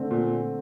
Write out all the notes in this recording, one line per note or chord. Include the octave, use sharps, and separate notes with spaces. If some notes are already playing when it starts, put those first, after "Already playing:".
Already playing: D3 A3 C4
A#2